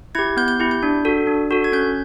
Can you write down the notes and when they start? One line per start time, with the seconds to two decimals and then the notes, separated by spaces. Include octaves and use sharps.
0.15 E4 G4 G#6
0.37 B3 G6
0.48 G6
0.60 E4 G4
0.71 G6
0.83 D4
1.05 F#4 A4
1.27 D4
1.51 F#4 A4
1.64 G#6
1.72 C#4 G6